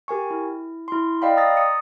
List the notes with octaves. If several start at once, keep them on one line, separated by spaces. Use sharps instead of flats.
G4 A#4 G#5 C#6
E4
E4 C6
D5 D#5 F5 G5 B5
A#5 D#6 E6 A6 A#6
D#6 C#7